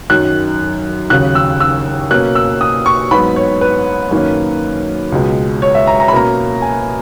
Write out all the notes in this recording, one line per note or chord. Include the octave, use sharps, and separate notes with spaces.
F#2 D#3 F#3 F#6
D#2 C#3 F#3 F#6
E6
E6
B2 A#3 C#4 F#6
E6
D#6
C#6
G#2 F#3 B3 B5
C#5
B4
F#2 D#3 A#3 C#4
C#2 B2 G#3
C#5
E5
A#5
A#5
B5
B2 A#3 C#4 A#5
G#5